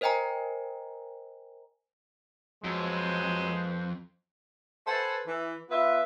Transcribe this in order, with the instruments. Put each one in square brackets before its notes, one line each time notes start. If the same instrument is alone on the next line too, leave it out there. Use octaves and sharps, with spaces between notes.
[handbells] A#4 C5 D#5 G5 G#5 A#5
[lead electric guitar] F2 [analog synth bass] F#3 [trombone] G#3 [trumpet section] B4 C5
[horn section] A4 B4 C5 F#5 G#5 A5
E3
B3 F4 B4 E5